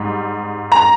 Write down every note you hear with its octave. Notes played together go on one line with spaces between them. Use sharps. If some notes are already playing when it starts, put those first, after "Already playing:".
Already playing: G#2 G3
A#5